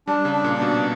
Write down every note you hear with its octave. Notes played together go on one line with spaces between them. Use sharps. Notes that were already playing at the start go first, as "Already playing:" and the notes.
G3 D4
C#3
D4
A#2
D4
B2